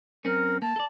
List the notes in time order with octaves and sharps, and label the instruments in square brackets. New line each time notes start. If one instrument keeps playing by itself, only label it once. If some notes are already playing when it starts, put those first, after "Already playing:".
[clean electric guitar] F#2 C4 C#4 [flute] A#4
[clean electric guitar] A#3 [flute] A5
[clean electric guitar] A4 D5